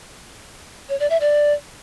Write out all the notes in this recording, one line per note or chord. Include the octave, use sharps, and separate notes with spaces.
C#5
D5
E5
D5